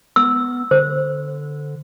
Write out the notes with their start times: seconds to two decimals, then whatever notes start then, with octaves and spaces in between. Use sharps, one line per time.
0.16 B3 E6
0.71 D3 C5